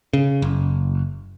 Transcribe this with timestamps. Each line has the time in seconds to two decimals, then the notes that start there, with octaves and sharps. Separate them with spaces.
0.13 C#3
0.42 F#1